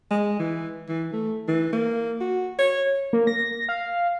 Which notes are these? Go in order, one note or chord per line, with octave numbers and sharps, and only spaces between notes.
G#3
E3
E3
A3
E3
A#3
F#4
C#5
A#3
A#6
F5